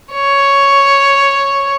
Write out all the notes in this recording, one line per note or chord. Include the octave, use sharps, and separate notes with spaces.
C#5